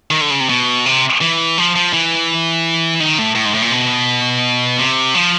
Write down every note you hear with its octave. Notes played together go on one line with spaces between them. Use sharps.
D#3
D3
C#3
C3
B2
C3
E3
F3
F3
E3
D#3
A2
A2
G#2
A2
A#2
B2
C3
F3